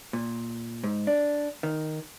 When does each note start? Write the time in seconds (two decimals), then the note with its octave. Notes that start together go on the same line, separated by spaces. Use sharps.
0.13 A#2
0.84 G#2
1.07 D4
1.63 D#3